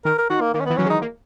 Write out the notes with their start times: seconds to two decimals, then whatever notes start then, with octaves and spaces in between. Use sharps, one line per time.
0.05 D#3 A#4
0.18 A#4
0.30 D#3 F#4
0.41 A#3
0.54 D#3 A#3
0.60 C#4
0.66 B3
0.70 E3
0.77 F#3 C#4
0.86 G#3
0.90 D#4
1.01 A#3